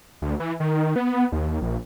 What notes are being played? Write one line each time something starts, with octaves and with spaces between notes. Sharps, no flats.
D2
E3
D#3
B3
D#2
A#1